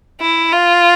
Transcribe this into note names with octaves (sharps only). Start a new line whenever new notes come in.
E4
F4